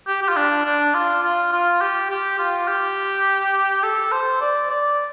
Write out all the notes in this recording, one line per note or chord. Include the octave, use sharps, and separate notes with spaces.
G4
G4
F4
D4
D4
F4
F4
F4
G4
G4
F4
G4
A4
C5
D5
D5